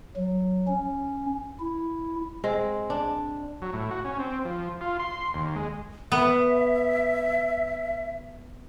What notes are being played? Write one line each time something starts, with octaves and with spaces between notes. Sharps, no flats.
F#3
C#4
E4
G#3 C4
D4
F#3
A2
F#4
C#4
C4
F3
F4
C6
D#2
G#3
B3 E5